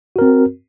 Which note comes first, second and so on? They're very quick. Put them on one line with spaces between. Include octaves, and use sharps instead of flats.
F#4 A#4 C4